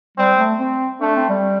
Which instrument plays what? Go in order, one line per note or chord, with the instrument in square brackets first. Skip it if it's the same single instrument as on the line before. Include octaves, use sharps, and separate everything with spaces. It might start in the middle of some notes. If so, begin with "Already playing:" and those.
[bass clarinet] G3 [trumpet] C4
[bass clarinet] A3
C4
[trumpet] A3 [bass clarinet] D4
[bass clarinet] C4
G3